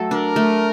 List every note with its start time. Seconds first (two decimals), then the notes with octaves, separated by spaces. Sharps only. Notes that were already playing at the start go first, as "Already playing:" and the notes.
Already playing: F#3 A3 A4
0.11 D4 A#4
0.36 A3